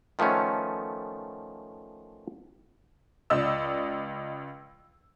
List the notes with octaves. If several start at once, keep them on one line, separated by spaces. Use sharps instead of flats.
D#3 F3 A3 B3 C#4
C#2 D5 D#5 E6